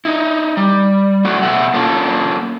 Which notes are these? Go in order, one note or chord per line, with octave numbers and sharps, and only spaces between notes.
D#4 E4
G3
F#3 A3 F#4
B2 A3 A4 F#5
A#3 C#4 F4 A4